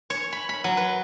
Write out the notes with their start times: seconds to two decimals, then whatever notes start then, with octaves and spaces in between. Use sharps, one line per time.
0.10 C#5
0.32 B5
0.49 B5
0.64 F#3
0.77 B4